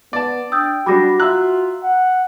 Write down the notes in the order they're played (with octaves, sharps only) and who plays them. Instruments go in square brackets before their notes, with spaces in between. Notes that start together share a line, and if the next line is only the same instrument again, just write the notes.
[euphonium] B3 [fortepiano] D5 A5 [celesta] D6
[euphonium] D4 [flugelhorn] G5 [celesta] D#6 E6 G6
[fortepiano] F#3 G3 D4 [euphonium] F#4 [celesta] B5 D6 A#6
[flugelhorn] F4 [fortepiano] E5 F#6 [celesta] A#5 E6
[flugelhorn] F#5